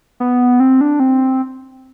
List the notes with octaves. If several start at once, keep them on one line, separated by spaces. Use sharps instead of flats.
B3
C4
D4
C4